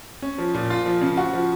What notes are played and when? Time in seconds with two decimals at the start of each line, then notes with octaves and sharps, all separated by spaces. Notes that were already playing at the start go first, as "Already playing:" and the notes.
0.22 C#4
0.38 F3
0.54 A#2
0.70 F4
0.86 F3
1.01 C#3
1.17 F#4
1.33 F3